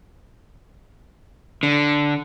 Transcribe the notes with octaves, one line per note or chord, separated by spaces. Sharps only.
D3